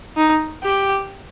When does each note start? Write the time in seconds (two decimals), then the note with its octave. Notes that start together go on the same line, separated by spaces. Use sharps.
0.17 D#4
0.63 G4